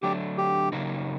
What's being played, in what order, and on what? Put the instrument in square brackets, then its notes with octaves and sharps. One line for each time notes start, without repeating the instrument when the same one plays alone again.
[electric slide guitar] D3 F#3 A3 D4 [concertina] G4
[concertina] G4
[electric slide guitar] C#3 F#3 A#3 D#4 G4